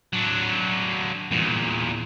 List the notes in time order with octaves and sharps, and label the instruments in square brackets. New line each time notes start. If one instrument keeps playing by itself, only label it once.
[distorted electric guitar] F#3 D4
E2 A#2